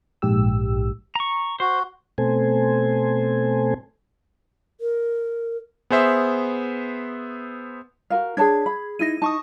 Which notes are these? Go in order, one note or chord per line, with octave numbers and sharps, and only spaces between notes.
A#1 G#2 G4 E6
A#5 C#6
F#4 C5
B2 A3 C4 A4 C5 G#5
A#4
B3 G#4 C5 E5
F#4 A#4 F5
D4 G#4 C#5 A5 G#6
B5
D#4 E4 A#6 D#7
D#4 A5 C#6 D#6